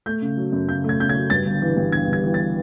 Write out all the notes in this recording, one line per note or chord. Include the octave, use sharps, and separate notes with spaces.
A3 G6
C#3
F#3
F#2
C#3 G6
A3 G#6
C#3 G6
G#6
F#3
G2 A6
G1
E3
G2
G1 G#6
G1 G#6
E3
A6